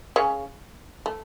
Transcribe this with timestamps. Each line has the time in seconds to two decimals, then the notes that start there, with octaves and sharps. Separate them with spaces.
0.16 C#3 C#4
1.06 A3